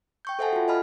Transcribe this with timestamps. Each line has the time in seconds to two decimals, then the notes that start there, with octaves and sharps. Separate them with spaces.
0.25 G5 C#6 G6
0.39 A4 C5 E5 F#5 G#5 A5
0.53 F4 F#4
0.68 D#5 G#5 A5 B5 F6